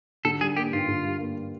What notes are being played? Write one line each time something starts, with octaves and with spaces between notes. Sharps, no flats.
D3 A4
G3 G#4
A#3 G4
G2 F4
D3
G3
A#3